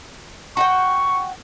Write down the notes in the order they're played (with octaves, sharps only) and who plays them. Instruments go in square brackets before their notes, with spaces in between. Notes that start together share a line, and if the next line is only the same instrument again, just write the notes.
[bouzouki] F#4 F#5 G5 [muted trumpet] C#6